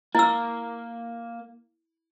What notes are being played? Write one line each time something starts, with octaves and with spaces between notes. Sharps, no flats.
A#3 E4 E6